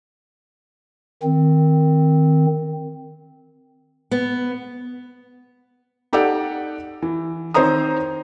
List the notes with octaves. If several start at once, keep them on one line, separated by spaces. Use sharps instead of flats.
D#3 C4
B3
D#4 G4 A4 D5 F#5
E3
D#3 C4 C5 C#5 A#5 D#6